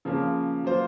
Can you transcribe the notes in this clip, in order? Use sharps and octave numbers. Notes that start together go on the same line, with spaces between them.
C#3 F3 A#3 C#4
F#3 A#3 F4 C5